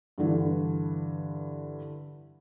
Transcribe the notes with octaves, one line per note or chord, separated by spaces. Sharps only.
G2 D3 E3